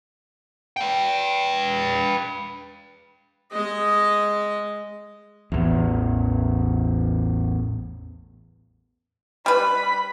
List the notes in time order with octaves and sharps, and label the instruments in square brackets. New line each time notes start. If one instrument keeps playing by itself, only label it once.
[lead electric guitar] B4 G5
[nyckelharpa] G#3 D#5
[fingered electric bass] A1 E2
[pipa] G3 B4 [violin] B5